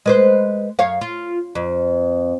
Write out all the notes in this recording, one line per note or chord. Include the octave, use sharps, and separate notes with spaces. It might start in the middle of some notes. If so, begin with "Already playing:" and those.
G#3 B4 C5
F#2 C#5 F5
F4
F2